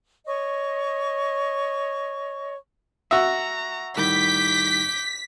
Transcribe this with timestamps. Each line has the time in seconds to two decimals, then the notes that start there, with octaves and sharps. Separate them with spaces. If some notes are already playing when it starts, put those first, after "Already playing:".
0.27 C#5 D#5 C#6
3.11 F#4 E5 A#5
3.97 A2 D#3 G3 D6 G6 B6